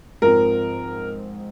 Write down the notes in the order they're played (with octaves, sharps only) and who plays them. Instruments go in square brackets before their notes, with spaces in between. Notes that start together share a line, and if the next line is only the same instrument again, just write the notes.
[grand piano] G#2 F3 C4 A#4